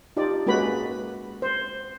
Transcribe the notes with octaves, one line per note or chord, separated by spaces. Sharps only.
D#4 F4 G4 D5
G#3 A#3 C#4 F#4 B4 B5
C5